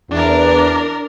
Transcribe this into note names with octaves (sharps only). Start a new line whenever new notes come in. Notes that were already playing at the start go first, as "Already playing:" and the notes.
E2 D4 A#4